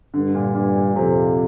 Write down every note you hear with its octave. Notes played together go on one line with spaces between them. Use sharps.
G2 D3
A#2
G2 A#2
A#2
F2 C3